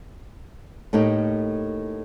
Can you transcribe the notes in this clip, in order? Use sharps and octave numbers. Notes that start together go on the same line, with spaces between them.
A2 A3 A#3 D#4 G4